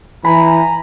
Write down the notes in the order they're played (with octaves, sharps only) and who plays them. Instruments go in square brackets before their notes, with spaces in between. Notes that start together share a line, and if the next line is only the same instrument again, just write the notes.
[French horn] E3 [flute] G#5 [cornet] A#5 [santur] B5